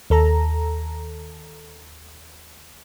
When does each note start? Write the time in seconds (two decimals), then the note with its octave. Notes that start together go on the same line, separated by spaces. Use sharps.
0.10 D#2 A4 A#5